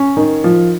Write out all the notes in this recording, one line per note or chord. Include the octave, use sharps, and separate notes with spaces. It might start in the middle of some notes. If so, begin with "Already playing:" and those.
Already playing: C#4
D#3
F3